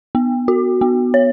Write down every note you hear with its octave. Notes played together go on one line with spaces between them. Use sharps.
B3
F#4
B3
C#5